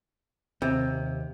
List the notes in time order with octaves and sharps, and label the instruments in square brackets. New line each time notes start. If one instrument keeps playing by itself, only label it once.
[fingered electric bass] D#2 [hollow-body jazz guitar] C3